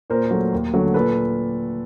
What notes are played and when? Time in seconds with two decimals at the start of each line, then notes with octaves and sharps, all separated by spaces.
0.10 A#2 A#4 C5
0.31 F#3 A3
0.53 D#2
0.74 D3 F#3 A3
0.94 A#2 A4 B4